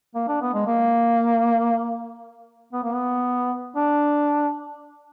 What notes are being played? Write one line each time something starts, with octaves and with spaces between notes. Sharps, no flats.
A#3
D4
B3
G#3
A#3
B3
A#3
B3
D4